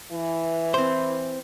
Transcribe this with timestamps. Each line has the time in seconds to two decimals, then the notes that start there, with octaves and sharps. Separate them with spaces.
0.12 E3
0.74 C4 C5